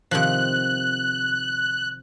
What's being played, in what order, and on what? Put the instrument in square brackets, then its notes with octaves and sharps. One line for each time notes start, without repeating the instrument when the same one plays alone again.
[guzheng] C3 D#3 F3 [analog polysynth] F#6